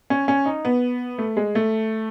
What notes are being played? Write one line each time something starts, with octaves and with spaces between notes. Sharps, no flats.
C#4
C#4
D#4
B3
A3
G#3
A3